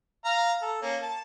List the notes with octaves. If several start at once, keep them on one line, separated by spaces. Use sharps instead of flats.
F5 A#5
A4
A#3 C#4
A5